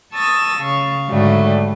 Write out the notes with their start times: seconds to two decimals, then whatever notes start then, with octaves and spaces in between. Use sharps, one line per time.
0.13 A5 C#6 D#6 E6 A6 A#6
0.59 C#3 F5 C#6
1.08 G#2 D3 F#3 G3 A3